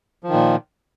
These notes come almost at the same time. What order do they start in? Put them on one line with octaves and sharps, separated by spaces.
F3 D#3 A#2